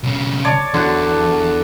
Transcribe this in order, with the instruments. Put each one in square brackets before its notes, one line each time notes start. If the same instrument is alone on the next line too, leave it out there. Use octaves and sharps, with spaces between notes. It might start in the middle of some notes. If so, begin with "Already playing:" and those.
[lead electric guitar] B1 C#3
[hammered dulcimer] C#5 D5 A5
[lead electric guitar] E2 [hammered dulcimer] D3 F#4